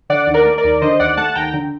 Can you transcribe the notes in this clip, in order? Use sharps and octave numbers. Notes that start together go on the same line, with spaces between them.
D3 D5 F#5
D#2
A#4 D5
A3
A#4 D5
D#2
D3 C5 D#5
D#2 D5 F#5
A3 F#5 A5
D#2 G5 A#5
D3